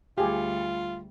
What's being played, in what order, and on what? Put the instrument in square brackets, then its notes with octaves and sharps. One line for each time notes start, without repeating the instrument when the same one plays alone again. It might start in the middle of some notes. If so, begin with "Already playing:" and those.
[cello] D2 G3 [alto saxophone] F4 [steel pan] G4 G#4